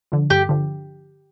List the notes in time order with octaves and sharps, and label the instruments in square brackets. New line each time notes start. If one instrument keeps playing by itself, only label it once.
[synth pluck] D3 F3
[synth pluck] G2 [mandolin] G4
[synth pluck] D3 F3